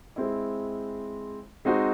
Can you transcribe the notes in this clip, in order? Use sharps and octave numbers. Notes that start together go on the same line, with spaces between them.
G#3 C4 E4
G#3 C4 D#4 F#4